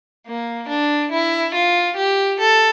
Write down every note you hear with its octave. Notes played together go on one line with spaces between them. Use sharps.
A#3
D4
E4
F4
G4
A4